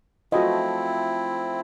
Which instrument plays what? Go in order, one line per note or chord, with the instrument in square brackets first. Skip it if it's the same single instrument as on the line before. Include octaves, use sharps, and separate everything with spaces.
[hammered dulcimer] F3 A3 A4 [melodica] C4 E4 [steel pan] F#4 D#5